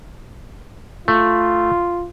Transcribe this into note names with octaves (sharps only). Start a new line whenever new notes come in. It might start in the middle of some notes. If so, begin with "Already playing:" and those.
A3 F4